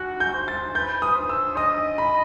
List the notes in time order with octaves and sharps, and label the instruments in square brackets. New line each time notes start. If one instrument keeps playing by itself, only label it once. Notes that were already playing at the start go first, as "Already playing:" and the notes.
Already playing: [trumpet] F#4 [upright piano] F#6
[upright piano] G6
[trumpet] C5
[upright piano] A6
[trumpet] B4 [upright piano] G6
[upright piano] D#6
[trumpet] C5
[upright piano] E6
[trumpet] D#5 [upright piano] D#6
[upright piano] B5